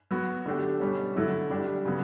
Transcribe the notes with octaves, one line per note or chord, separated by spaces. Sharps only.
F#3 B3 F#4
D3 A3 D4 G4
B2 G3 C#4
D3 F#3 A3 E4 A4
D3 G3 D4 G4
C#3 F#3 B3